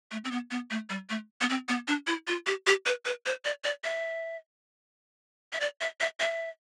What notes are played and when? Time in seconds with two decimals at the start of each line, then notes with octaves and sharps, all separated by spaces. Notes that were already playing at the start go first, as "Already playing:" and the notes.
0.11 A3
0.24 C4
0.31 B3
0.51 B3
0.70 A3
0.90 G3
1.10 A3
1.41 B3
1.49 C4
1.68 B3
1.88 D4
2.07 E4
2.27 F4
2.46 G4
2.67 G4
2.86 B4
3.05 B4
3.26 C5
3.45 D5
3.64 D5
3.84 E5
5.53 E5
5.60 D5
5.81 E5
6.00 E5
6.20 E5